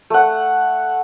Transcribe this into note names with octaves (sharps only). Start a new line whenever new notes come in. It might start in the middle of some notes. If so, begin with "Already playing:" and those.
A3 F#5